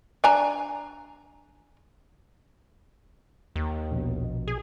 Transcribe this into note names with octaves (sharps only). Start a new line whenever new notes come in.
D4 G#5 A#5
D#2
A#1 B2
G#4